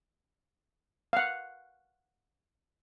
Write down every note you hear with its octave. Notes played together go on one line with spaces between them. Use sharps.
F5 F#5